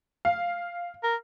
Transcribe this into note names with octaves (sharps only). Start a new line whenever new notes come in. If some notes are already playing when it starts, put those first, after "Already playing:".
F5
A#4